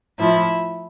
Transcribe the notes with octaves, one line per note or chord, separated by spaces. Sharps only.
A2 F3 E4